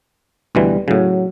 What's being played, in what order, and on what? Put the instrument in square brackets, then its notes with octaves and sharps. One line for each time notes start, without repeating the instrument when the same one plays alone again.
[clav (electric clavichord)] D2 B2 E3 [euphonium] G3
[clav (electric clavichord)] A2 C#3 [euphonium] F#3